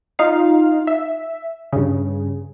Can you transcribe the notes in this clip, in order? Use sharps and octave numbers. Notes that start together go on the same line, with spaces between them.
D#4 F4 F5
E5
G2 C#3